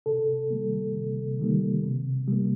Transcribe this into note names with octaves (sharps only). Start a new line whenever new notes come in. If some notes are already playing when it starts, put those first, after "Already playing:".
C3 A4
D#3 G3 A#3
C3
D#3 G3 A#3
C3
G3 A#3